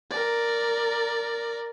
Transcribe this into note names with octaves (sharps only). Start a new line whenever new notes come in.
A#4 D5